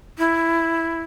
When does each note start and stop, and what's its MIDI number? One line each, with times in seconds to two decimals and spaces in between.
0.18 1.02 64